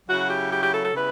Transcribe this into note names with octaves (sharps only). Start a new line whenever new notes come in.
C#3 F#3 C#4 E4 F#4
G4
G4
G4
A4
A4
C#3 G3 B3 E4 B4